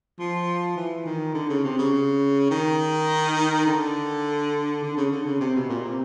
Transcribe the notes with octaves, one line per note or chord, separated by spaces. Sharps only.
F3
E3
D#3
D3
C#3
C3
C#3
D#3
D3
D3
C#3
D3
C#3
C3
B2
A#2
C3